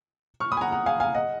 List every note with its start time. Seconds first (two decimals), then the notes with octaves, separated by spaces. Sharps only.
0.40 C#6 F6
0.52 B5 D#6
0.57 G#5
0.61 F#5 A#5
0.72 F#5 A#5
0.86 F5 G#5
1.00 F5 G#5
1.15 D#5 F#5